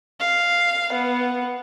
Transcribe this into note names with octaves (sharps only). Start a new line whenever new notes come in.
F5
B3